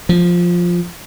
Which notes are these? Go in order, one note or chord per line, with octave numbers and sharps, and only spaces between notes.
F3